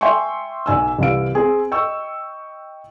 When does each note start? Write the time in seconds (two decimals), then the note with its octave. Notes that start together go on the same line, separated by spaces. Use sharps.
0.01 E5 G5 G#5 C6 C#6
0.66 B1 G#5 E6
0.99 C2 E3 F5 D7
1.35 C4 G#4
1.71 D#5 G5 C#6 E6